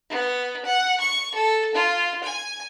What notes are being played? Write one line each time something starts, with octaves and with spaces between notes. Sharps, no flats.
B3
F#5
C#6
A4
F4
G#5